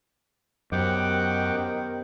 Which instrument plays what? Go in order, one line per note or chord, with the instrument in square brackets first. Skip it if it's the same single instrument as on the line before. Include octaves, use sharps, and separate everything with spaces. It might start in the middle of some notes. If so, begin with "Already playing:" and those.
[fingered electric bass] F#2 [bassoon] D#3 [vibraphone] B3 G4 C5 [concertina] F#5 G5 D6